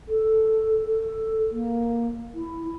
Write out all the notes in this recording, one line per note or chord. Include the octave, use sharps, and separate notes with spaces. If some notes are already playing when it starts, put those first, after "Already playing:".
A4
A4
A#3
E4